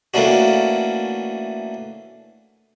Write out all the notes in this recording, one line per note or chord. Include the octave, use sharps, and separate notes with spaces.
E3 A3 A#3 C#4 D4 F#4